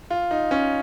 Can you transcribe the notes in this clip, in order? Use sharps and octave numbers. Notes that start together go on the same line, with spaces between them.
F4
D#4
C#4